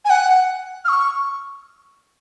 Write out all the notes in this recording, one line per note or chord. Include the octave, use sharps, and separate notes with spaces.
G#5
F#5
F6
C#6